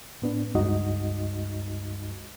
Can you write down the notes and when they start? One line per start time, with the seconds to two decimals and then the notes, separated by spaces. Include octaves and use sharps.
0.22 A2 B3 D4
0.55 C#2 G2 G#3 D#4 F#4 D#5